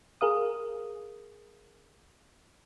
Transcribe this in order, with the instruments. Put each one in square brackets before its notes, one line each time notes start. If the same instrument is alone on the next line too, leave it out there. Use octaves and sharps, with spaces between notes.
[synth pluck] G#4 A#4 F5 D#6